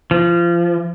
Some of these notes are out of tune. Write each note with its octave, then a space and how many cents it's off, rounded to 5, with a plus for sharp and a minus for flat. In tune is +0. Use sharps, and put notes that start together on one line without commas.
F3 -25